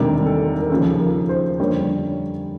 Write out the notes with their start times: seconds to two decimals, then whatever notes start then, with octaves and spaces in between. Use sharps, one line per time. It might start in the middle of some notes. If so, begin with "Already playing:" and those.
Already playing: E1 D2 C3 D#3 G3 A#4
0.25 A4
0.62 A#4
0.70 D#2 C#3 F3 A4
1.00 A#4
1.29 C5
1.59 F2 D3 G3 A#3 C#5